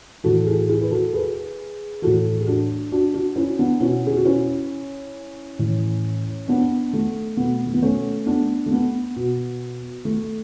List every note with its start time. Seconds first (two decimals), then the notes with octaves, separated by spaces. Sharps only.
0.24 A2 E3 F#4 A4
0.46 E4 G#4
0.69 E4 G#4
0.81 B4
0.91 F#4 A4
1.13 G#4 B4
2.02 A2 E3 F#4 A4
2.41 G#4
2.46 D4 F#4
2.92 D4 F#4
3.14 D4 F#4
3.36 C#4 E4
3.59 B3 D4
3.80 B2 C#4 E4
4.07 G#4
4.16 F#4
4.25 C#4 E4
5.59 A2 E3
6.48 B3 D4
6.93 A3
7.37 B2 B3
7.66 A3
7.74 B3
7.82 A3 C#4
8.26 B3 D4
8.66 A3
8.71 B3
9.16 B2
10.05 A3